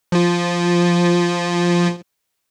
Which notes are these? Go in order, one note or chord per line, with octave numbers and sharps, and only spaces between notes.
F3 F4